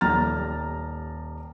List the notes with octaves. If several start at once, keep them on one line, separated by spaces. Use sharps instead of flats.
D#1 G3 A#5 F6 A6